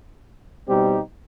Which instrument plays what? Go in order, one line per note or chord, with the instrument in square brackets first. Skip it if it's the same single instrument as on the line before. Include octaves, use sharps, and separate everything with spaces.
[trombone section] B2 G3 C4 D#4 G4